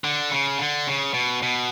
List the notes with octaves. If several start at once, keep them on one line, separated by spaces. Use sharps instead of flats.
D3
C#3
D3
C#3
B2
B2